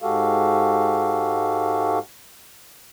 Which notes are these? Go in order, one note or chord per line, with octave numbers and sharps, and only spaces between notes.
G#2 G#3 F#4 G4 A4 F5